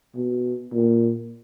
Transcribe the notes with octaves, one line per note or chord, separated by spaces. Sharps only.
B2
A#2